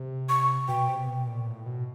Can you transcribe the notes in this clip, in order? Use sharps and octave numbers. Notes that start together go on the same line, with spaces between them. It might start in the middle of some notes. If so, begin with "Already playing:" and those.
Already playing: C3
C#6
B2 G5
C3
B2
A#2
A2
B2